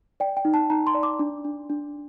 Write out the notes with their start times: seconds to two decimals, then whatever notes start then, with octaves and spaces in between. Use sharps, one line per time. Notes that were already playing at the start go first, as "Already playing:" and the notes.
0.20 D5 G5
0.37 G5
0.45 D#4
0.54 A5
0.70 D#4 A#5
0.87 C6
0.95 D5
1.03 D6
1.19 D4
1.45 D4
1.70 D4